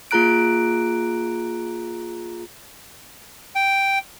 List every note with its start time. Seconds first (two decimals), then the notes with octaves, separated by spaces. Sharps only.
0.11 A#3 F4 G#4 A#5 F#6 D7
3.55 G5